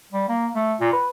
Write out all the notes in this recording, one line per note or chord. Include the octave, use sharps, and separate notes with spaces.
G3
A#3
A3
A#2
B4